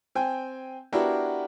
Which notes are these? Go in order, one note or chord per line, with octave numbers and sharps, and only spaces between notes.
C4 G5 G#5
B3 D4 E4 F#4 G4 A#4